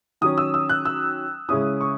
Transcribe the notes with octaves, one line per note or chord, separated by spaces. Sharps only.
D#3 F#3 C#4 D#6
E6
E6
F#6
E6
C#3 G#3 C#4 E4 D#6
C#6